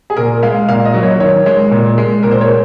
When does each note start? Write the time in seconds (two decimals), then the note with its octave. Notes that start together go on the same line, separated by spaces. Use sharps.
0.10 G#4
0.17 A#2 A#4
0.42 G#3 F5
0.68 A#2 F5
0.85 D#5
0.94 F#3 A#3
1.03 C#5
1.20 D#3 C#5
1.46 G#3
1.71 A#2
1.98 G#3
2.23 A#2 A#4
2.31 C5
2.41 C#5
2.49 G#3